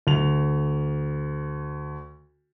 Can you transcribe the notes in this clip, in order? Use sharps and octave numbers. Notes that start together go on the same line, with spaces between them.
D2 F7